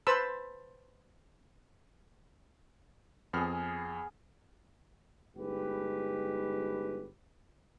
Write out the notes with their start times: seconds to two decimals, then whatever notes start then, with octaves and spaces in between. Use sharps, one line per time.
0.07 B4 C5 A5 B5 E6
3.33 F2 B3 G#4 F6
5.36 G1 G#3 D#4 G4 B4